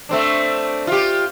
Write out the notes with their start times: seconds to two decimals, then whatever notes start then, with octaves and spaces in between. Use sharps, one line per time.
0.09 A3 C4 D4
0.87 F4 G4